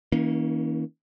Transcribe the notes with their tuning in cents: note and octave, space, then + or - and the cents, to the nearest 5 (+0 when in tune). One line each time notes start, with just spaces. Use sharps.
E3 -45 A#3 +10 C#4 +0